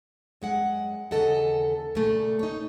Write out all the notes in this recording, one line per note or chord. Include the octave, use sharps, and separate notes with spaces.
F#2 G#3 F#5
D#2 C#3 E3 A4 D#5 F#5
A#2 C#3 A3
D#4 C#5